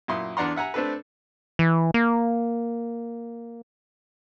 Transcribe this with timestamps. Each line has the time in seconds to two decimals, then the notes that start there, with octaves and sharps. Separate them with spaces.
0.08 F#2 A#2 E4 C6 D#6
0.37 E2 D4 D5 F#5 A#5 C6
0.56 E5 F#5 G#5 A#5
0.74 A3 C4 D4 A4 B4
1.59 E3
1.94 A#3